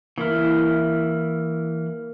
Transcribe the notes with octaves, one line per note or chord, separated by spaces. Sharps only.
E3 A#3 E4 A#4 F6